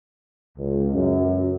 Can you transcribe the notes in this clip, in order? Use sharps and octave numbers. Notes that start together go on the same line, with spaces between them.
C#2
F#2